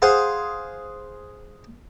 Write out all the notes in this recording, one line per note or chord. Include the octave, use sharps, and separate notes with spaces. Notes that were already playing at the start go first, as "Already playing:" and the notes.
G#4 C5 F5 F#5 G#5